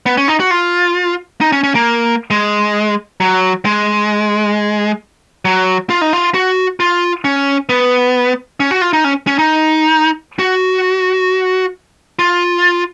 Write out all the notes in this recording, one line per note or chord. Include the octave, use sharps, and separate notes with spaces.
B3
C#4
D#4
F#4
F4
D#4
C#4
C#4
A#3
G#3
F#3
G#3
F#3
F4
D#4
F4
F#4
F4
C#4
B3
C#4
F#4
F4
D#4
C#4
C#4
D#4
F#4
F4